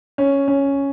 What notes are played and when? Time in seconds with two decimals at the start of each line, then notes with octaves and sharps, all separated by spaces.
0.18 C#4
0.48 C#4